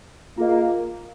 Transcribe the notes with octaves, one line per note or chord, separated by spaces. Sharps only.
A#3 F4 G#4 D#5